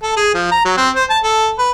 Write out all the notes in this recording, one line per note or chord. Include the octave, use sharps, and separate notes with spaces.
A4
G#4
F3
A#5
F#3
C4
C5
A5
A4
B4